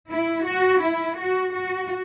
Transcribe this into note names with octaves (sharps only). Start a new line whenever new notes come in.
E4
F#4
E4
F#4
F#4